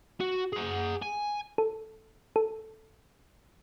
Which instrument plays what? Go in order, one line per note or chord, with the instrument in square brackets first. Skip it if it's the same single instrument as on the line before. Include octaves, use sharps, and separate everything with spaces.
[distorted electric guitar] F#4
G#4 F#5
G#5
[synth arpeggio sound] A4
A4